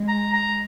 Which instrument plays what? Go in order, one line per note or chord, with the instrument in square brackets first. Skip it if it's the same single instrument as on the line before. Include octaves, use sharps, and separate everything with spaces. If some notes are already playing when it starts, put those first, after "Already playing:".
Already playing: [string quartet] G#3
[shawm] A#5
A#5